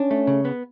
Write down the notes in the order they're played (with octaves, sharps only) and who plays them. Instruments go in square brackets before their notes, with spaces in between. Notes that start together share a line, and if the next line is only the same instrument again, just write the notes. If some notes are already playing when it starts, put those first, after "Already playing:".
Already playing: [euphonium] C#4 [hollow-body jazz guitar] D4
[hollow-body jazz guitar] A3
C#3
B3